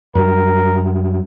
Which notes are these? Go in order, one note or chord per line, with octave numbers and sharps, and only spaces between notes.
F#2 G3 A#4